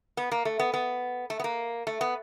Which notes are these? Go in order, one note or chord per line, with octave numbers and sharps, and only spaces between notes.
B3
A#3
A3
B3
B3
A3
B3
A#3
A3
B3